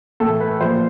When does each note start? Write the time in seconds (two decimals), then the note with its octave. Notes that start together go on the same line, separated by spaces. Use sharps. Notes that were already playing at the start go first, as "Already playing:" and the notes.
0.20 A2 E3 A4
0.40 B4
0.61 A#2 F3 C5